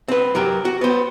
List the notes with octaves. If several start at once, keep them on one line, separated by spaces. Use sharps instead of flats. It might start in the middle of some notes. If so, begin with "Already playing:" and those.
C4 B4
F#3 G4 A#4
F#4
B3 C5